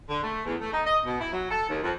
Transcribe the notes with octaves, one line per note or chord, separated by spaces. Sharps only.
D3
A3
E2
A3
D#4
D#5
B2
E4
F#3
A4
D#2
F2